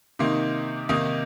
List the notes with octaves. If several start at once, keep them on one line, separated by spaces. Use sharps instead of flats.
C3 D#3 A#3 D#4 C6
C3 D#3 A#3 D#4 D#6